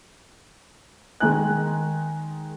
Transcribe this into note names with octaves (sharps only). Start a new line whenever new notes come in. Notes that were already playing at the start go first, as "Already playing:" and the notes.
D#3 G#3 D#4 G#5 F#6